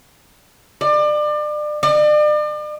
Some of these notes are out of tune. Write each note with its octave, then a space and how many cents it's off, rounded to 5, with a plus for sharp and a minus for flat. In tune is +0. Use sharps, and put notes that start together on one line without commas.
D5 +30
D5 +40